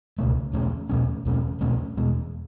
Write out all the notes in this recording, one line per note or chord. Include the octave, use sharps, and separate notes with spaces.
C#2 B2 A3
E2 B2 A3 C#4
E2 B2 A3 C#4
E2 B2 A3 C#4
E2 B2 A3 C#4
E2 B2 G#3